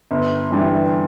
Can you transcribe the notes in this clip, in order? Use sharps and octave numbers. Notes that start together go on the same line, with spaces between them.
G1
G2 E3 G3